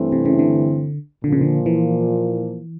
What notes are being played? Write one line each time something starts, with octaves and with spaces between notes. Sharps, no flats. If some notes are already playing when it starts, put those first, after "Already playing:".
Already playing: G2 E3 A3 C4 E4
C3
C#3
D3
A#2 D3 F3 A#3
C#3
D3
E3